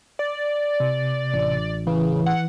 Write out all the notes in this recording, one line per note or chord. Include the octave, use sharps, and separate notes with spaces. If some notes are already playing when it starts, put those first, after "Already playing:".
D5
C3
A1
C#3 E3
F#5